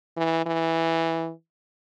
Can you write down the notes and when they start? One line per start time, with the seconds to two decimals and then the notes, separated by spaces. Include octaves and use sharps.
0.17 E3
0.46 E3